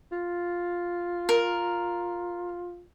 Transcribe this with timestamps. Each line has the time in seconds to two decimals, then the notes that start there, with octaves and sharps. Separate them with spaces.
0.12 F4
1.29 A#4